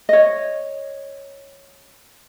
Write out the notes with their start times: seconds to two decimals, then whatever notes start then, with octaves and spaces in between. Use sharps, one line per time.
0.09 C#5 D#5